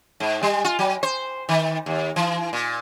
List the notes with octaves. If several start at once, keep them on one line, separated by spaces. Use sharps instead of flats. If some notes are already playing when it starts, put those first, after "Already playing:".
G#2
G3
F4
F#3
C5
D#3
D#2
E3
A#2